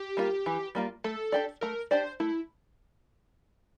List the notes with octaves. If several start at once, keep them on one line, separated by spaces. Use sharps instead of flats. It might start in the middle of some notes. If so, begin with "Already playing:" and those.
Already playing: G4
G3 A#3 F4
E3
G3 A#3 F4
A3 A4
D4 G4 D5
A3 A#4
D4 G4 C5 D5
A3 E4